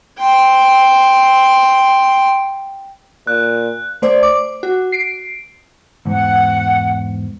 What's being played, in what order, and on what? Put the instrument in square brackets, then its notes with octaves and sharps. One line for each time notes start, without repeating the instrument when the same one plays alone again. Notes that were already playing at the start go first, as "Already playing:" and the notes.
[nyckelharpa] G5 C6
[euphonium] A#2 [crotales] F#6
[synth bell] A3 C5 D5
D6
F#4
C7 D7
[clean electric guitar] E2 G#2 [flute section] F#5